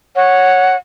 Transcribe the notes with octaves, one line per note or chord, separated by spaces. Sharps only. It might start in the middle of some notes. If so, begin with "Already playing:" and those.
C#5 F#5